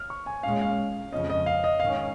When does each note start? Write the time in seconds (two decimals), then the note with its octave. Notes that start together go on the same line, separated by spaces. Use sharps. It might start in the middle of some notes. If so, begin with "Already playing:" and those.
Already playing: F6
0.10 C#6
0.26 G#5
0.43 A#2 G#3 C#4 F5
0.61 F5
1.12 F2 C#3 F3 C#4 D#5
1.30 D#5
1.46 F5
1.64 D#5
1.80 G#2 D#3 C#4 F5